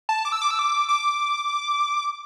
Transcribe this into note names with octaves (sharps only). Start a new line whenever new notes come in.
A5
D6
E6
D6
E6
D6
D6